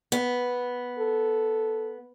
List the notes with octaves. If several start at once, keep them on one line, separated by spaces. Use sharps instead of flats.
B3
A4